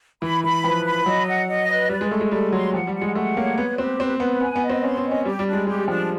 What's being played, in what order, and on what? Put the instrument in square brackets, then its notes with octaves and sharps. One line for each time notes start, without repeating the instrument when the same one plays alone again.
[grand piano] E3 [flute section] B5
[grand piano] E3 [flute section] B5
[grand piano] F3 [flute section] B4
[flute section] B5
[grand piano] F#3 [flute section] D#5
[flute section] F#5
D#5
B4
[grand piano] G3 [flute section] D5
[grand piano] G#3
[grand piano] A3 [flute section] A4
[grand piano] G#3
[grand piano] G3 [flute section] A4
[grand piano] F#3 [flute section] C6
[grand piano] F3 [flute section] F#5
[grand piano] G3
[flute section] F#5
[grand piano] G#3
[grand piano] A3 [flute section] F#5
[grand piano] A#3 [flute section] C#5
[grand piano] B3 [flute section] B4
[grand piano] C4 [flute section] G4
[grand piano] C4 [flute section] B4
[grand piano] B3 [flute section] B4
[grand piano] B3 [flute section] G#5
[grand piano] B3
[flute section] D#5
[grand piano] C4
[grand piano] C#4 [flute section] C6
[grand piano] C4
[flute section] D#5
[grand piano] C#4
[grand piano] G3 [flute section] G4
[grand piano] G3
[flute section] D4
[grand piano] G#3
[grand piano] G#3 [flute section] G4
[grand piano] F3 [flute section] D4